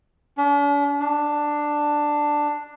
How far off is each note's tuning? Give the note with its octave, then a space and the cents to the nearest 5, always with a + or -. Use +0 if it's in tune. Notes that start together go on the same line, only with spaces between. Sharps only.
D4 -45
D4 +5